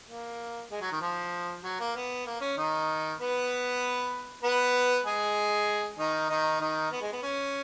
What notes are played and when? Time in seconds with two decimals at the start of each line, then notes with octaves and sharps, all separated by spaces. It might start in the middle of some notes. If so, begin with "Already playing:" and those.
0.09 A#3
0.72 G#3
0.81 F#3
0.92 D#3
1.02 F3
1.64 F#3
1.80 A#3
1.96 B3
2.26 A#3
2.41 C#4
2.57 D#3 D#4
3.20 B3 B4
4.43 B3 B4
5.05 G#3 G#4
5.98 D#3 D#4
6.29 D#3 D#4
6.60 D#3 D#4
6.92 B3
7.02 G#3
7.13 B3
7.23 C#4